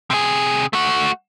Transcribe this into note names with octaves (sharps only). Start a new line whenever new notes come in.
C3 G#4
A3 F#4